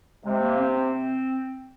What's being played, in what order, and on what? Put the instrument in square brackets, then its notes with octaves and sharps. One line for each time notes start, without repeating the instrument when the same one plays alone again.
[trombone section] C3 [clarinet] G#3
[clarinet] A#3
C4
C4